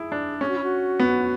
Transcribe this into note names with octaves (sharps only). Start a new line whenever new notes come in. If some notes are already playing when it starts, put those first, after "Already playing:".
Already playing: E4 G#4
D4
C#4 G#4
F#4
E4
F#4
B3